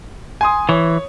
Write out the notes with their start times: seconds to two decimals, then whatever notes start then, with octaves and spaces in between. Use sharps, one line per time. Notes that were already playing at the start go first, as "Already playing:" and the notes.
0.41 G#5 C6 D#6
0.69 E3 C#5